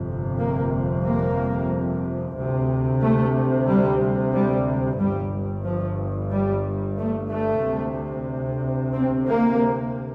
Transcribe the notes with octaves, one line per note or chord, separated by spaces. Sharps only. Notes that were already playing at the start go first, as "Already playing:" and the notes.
Already playing: G1 F2 C3
A#3
A#3
D2 C3
A3
G3
G3
G1 G2 G3
F3
G3
A3
A3
D2 C3
C4
A#3